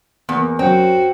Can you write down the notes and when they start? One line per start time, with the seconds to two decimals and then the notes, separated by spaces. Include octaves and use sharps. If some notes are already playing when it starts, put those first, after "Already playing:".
0.29 E2 A#3 B3
0.59 F#2 C4 F#4